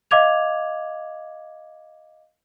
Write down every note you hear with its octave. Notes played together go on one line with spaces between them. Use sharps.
D#5 F5 D6 G#6 F7